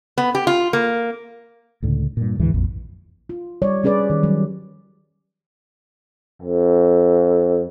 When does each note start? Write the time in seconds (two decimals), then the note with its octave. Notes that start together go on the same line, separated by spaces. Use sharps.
0.18 B3
0.35 G4
0.47 F4
0.73 A#3
1.82 C#2 A2 D3
2.17 G2 A#2
2.39 D2 G#2 E3
2.54 A#1 F2
3.29 F4
3.62 G3 C#5 D5
3.84 G3 C#4 G#4 B4 D5
4.10 D#3
4.23 F#3 G3
6.42 F2